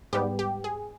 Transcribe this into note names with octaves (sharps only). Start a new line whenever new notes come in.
G#2 G3 B3 G4
G4
G#4